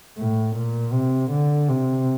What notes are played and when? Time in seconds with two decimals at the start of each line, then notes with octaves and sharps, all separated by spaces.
0.18 A2
0.56 A#2
0.93 C3
1.31 D3
1.68 C3